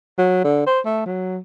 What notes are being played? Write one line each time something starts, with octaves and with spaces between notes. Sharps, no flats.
F#3
D3
C5
A3
F#3